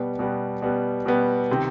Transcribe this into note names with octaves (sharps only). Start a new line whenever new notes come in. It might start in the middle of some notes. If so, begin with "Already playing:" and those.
Already playing: B2 G3 B3
B2 G3 B3
B2 G3 B3
B2 G3 B3
C3 D#3